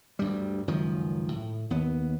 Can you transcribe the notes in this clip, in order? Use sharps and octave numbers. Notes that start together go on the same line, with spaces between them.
D2 G2 G3
C#2 F#2 D#3 F3
A2
D#2 B3